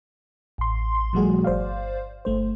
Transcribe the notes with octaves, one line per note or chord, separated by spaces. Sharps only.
A1 C6
A#2 F3 G3 A3 F#4 G#4
G1 C5 D5 F5
G1 A3 C5